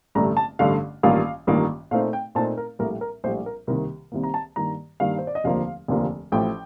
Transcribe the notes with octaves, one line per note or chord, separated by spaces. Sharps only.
A1 G2 D3 A3 A#5
A5
A1 G2 D3 A3 F5
A1 G2 D#3 A#3 F4 F5
A1 G2 D#3 A#3 F4
A#2 A3 C4 D#4 F5
G5
A#2 A3 C4 D#4 A5
A#4
A#1 A2 G3 A#4
A#4
A#1 A2 G3 C5
A#4
C2 C3 D#3 A#3 A#4
C2 C3 D#3 A#3
A#5
A5
G2 D#3 A#3 A#5
G2 D#3 A#3 F5
C5
D5
D#5
F1 D#2 D3 F3 A#3 F5
F1 D#2 D3 F3 A#3
A1 A2 F3 G5